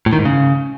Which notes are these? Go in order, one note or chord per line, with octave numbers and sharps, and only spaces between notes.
A2
D#3
G#2
C#3